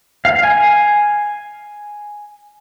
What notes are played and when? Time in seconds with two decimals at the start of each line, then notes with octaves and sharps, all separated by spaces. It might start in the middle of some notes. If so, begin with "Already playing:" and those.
0.25 F5
0.43 G#5